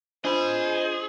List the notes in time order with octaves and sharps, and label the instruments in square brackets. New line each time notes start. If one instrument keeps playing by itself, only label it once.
[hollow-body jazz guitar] D4 F4 G#5 [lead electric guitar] G#4 [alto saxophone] C5 [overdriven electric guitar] D#5 B5